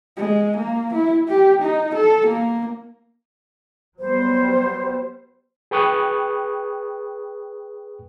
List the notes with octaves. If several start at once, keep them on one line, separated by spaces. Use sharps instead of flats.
G#3
A#3
E4
G4
D#4
A4
A#3
F#3 G3 B3 C5
G#4 B4 G5 C#6 D#6 F#6